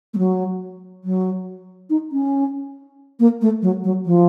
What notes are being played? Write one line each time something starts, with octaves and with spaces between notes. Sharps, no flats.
A3
F#3
F#3
D#4
C#4
A#3
A3
F#3
F#3
F3